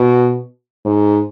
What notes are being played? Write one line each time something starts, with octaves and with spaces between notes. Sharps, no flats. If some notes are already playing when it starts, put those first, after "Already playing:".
Already playing: B2
G#2